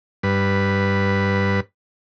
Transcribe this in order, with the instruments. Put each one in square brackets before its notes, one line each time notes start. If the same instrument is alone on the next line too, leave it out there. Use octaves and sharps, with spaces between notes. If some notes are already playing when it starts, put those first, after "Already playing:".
[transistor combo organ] G2 B4